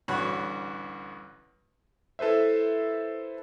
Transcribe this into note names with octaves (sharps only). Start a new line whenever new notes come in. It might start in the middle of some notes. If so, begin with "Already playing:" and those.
A1 D2 G2 F#4 C#5 B5
E4 A4 B4 C5 E5